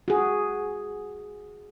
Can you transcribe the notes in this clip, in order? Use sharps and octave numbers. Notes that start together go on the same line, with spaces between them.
F#4 G#4